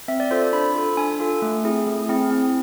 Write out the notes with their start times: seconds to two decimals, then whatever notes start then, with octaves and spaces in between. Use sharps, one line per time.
0.08 C4 E5
0.20 D5
0.31 F4 A4 C5
0.42 D5
0.53 D4 B5
0.75 F4 A4
0.97 D4 G#5
1.20 F4 A4
1.42 A3
1.64 C4 E4 G#4
1.86 A3
2.09 C4 E4 G#4
2.31 C4